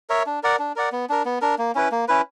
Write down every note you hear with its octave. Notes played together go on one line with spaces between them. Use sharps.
A#4 C#5 E5
D4
A#4 D5 F#5
D4
A#4 D5 F#5
B3
D4 A#4
B3
D4 A#4
A#3
C#4 E4 B4
A#3
C#4 E4 B4